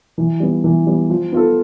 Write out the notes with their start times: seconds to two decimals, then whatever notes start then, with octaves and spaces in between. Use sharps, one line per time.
0.18 E3
0.40 G3 B3
0.64 E3
0.86 G3 B3
1.10 F3
1.32 B3 F4 A4